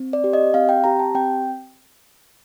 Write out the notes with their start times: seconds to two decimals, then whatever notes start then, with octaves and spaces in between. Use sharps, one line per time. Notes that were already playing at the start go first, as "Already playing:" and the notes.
Already playing: C4
0.13 D5
0.24 G4
0.33 D#5
0.54 C4 F5
0.69 G5
0.84 G4 A#5
0.99 A5
1.15 C4 G5